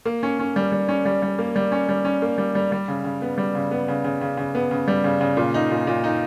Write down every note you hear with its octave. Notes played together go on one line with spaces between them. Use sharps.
A#3
C#4
C#4
G3
G3
C#4
G3
G3
A#3
G3
C#4
G3
C#4
A#3
G3
G3
G3
C#3
C#3
B3
G3
C#3
B3
C#3
C#3
C#3
C#3
B3
C#3
G3
C#3
C#3
A#2
D#4
A#2
A#2
D#4